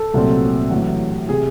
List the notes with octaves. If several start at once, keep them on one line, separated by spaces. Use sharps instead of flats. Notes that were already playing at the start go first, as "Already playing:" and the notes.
Already playing: A4
C2 A#2 F#3 A3 C4
A1 A2 F#3
C3 G#4